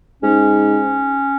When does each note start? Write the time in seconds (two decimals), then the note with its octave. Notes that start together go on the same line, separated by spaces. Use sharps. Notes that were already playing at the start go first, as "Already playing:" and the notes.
0.23 G#2 C#4